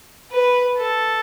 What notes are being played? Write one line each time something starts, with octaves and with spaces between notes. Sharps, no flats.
B4
A4